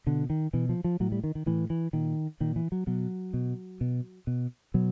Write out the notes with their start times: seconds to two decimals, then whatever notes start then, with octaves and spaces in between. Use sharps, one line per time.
0.06 B2 D3
0.30 D#3
0.53 B2 E3
0.69 F3
0.84 F3
1.00 A2 F#3
1.12 G3
1.24 D#3
1.35 D#3
1.46 A2 E3
1.70 E3
1.93 A#2 D#3
2.40 A#2 D#3
2.56 E3
2.72 F#3
2.87 B2 F#3
3.34 B2
3.81 B2
4.27 B2
4.74 B2 F#3